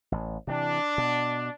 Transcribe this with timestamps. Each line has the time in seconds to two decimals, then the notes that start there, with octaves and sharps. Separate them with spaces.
0.12 A1
0.47 C3 E3 D4
0.98 B2